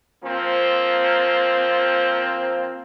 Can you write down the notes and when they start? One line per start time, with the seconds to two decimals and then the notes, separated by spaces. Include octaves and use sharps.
0.23 F3 A#3 C4